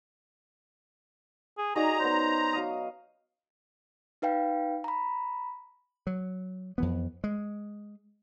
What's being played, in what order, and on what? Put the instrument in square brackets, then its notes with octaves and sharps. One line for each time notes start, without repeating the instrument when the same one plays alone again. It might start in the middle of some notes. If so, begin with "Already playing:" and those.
[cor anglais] G#4
[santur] D#4 F#4 D5 [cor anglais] G#4 [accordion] A#5
[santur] B3 C#4 [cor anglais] C5
[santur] F#3 F5 D#6
[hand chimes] D#4 B4 F5 G5
A#5 B5
[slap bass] F#3
F2 E3 B3
G#3